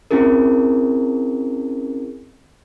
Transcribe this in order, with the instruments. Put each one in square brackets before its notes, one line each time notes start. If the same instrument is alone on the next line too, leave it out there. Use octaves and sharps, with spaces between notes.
[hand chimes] C4 C#4 E4 G#4 A#4